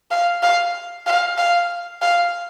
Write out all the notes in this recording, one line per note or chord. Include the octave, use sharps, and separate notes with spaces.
F5
F5
F5
F5
F5